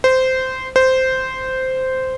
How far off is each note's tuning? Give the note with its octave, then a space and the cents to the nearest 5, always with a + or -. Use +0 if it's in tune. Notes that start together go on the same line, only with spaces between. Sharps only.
C5 -15
C5 -10